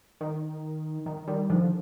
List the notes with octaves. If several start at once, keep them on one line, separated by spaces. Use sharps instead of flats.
D#3
D#3
D#3 G3
D3 F3